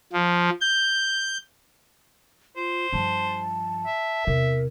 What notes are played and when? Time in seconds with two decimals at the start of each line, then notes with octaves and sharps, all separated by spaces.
0.13 F3
0.61 G6
2.56 F4 C5
2.93 G2 F3 A5
3.86 E5
4.27 E2 C3 A#4